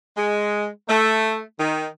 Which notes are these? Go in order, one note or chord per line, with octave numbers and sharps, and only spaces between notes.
G#3
A3
D#3